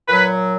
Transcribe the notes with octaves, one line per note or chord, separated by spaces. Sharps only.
A#2 F#3 B4